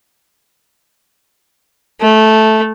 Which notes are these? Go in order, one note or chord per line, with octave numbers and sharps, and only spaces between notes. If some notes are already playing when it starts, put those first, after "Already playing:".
A3